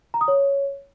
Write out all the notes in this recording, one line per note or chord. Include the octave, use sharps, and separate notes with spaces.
A#5
D#6
C#5